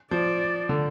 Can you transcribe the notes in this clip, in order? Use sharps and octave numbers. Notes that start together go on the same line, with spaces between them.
F3 D5
D3